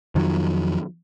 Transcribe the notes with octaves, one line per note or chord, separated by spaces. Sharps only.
F2 D#3 F3 F#3